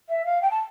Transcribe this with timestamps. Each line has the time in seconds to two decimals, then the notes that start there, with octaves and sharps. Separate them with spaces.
0.09 E5
0.25 F5
0.41 G5
0.50 A5